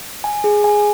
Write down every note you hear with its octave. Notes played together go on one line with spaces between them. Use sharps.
G#5
G#4
G#5